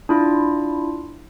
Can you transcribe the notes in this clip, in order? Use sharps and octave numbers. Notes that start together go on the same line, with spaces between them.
D4 E4 F4